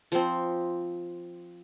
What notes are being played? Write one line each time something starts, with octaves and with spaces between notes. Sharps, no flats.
F3 C4